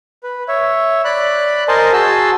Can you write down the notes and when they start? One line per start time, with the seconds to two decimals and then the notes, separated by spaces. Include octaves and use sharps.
0.23 B4
0.48 C#5 E5
1.05 D5 B5 F#6
1.68 A#4 C5 D#5 G#5 A5 C6
1.93 F#4 G#4 A5 C6 E6